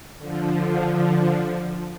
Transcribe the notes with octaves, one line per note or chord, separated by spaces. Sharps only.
D3 F3